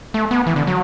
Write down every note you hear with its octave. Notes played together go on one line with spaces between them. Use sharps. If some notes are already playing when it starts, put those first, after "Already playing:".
A3
B3
E3
D3
F#3